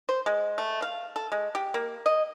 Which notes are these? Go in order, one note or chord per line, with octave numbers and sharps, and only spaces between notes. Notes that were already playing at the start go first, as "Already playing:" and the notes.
C5
G#3
A3
F5
A4
G#3
G4
A#3
D#5